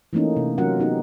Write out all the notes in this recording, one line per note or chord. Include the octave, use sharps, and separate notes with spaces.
E3 A3 A#3 C#4 D#4
C3
F#3 C#4 F4 A#4 F#5
B3 D#4 G4